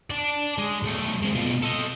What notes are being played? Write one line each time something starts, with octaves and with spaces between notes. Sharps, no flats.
D5 A5
G#3
B1 A3
G#3 C4
B2 F4
A4 D#5